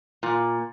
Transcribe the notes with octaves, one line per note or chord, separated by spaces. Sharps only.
A#2